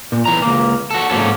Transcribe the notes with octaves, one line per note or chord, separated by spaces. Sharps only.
A#2
B1 E3 A#5
C#2 A#3
F#4 A4
G#2 F#3 A#3 C#4 A4